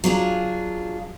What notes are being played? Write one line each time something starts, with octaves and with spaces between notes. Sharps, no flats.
F#3 D4 F4 G#4